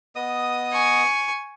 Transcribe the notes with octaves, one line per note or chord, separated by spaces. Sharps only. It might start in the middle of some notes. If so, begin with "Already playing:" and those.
B3 D#5 D#6
G#5 C#6